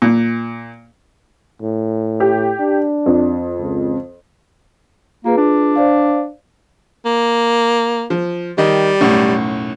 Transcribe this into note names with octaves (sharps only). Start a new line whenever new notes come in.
A#2
A2
G4
D4
F2
C#2
A#3 F4 G#4 B4
D4
C5 D5 F5
A#3
F3
D#3 G3 D#5
B1 F#2 A2